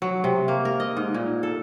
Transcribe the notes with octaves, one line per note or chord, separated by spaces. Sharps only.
F#3
C3
A#3
A#4
D#5
G#2
A#2
A4